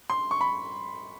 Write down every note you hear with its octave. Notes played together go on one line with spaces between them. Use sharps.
C6
C#6
B5